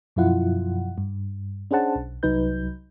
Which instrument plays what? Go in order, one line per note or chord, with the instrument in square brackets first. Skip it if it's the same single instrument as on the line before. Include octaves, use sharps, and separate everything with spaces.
[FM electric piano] F#2 B2 F3 E4 F4 F#5
G2
C#4 D4 G#4 C5 F#5 A5
B1
C2 F#3 D#4 B4 G6